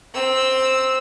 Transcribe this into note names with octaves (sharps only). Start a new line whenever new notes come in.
C4 E6